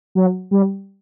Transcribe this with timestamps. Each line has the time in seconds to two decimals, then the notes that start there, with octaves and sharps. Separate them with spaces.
0.15 F#3
0.51 G3